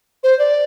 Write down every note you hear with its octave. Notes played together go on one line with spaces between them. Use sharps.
C5
D5